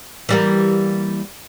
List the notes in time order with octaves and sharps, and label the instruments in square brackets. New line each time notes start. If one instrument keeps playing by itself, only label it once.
[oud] E3 G3 A#3